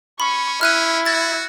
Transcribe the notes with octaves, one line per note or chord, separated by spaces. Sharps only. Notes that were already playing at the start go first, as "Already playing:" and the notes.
C#4 B5 C#6
C#4 E4 F6 F#6 D#7
F#4 G#6 A6